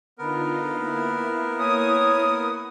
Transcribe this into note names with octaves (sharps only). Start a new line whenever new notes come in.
D3 B3 D#4 F4 A#4
A#3 E4
C#5 G#5 D#6